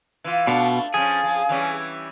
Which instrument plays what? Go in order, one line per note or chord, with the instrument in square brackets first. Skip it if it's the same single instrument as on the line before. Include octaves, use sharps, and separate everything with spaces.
[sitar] E3 F4
[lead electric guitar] B2 [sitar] A3 D4 F4
[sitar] F3 C#4 [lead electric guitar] G#4
[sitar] F3
E3 G3 C#4